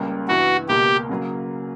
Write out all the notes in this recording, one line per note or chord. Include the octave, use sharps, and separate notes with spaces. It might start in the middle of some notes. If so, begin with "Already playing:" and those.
Already playing: C#2 C#3 G3 A#3
G2 E3 B3 F#4
C#2 B2 A#3 G4
C#3 F#3 A#3